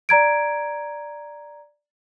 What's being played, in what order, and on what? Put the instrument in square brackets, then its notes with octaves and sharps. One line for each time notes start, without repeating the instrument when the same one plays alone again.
[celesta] D5 A#5 G#6 D7